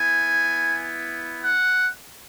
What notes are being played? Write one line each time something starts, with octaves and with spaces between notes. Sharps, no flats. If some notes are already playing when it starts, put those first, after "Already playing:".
Already playing: B3 E4 G#5
F#5